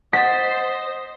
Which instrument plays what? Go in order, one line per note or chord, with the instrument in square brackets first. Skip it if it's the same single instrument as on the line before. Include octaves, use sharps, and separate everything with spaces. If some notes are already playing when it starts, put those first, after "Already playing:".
[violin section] C5 [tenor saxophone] D#5 [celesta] F#5 A6 [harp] B6